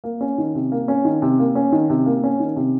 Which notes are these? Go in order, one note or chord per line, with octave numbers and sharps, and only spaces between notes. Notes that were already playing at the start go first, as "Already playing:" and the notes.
A#3
C#4
D#3
C3
A#3
C#4
D#3
C3
A#3
C#4
D#3
C3
A#3
C#4
D#3
C3